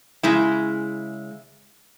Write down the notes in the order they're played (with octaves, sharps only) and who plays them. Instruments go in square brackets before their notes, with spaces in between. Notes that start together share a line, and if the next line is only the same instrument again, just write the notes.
[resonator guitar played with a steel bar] C#3 G#3 E4